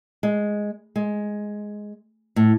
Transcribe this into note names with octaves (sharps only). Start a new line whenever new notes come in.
G#3
G#3
A2